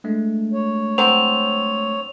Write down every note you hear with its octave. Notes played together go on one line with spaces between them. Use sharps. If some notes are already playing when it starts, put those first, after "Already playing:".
G#3 A3 D4
C#5
F#3 C4 F7